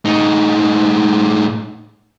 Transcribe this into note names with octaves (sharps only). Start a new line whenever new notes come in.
A2 D#4